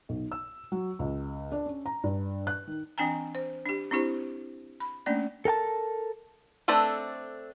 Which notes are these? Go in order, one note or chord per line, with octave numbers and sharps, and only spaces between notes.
B1
E6
F#3
C#2
D4
C#4
A#5
G2
F#6
D#3
E3 C4 D4 G5 G#5 A#5
C5
D4 G4
C4 D4 E4 G4 C5
B5
A3 A#3 C#4 D4 D5
A4 A#4 G5 A5
A3 C4 D4 A4 B4